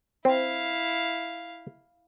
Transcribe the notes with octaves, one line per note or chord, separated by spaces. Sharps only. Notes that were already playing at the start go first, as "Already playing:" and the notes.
C4 E4 F5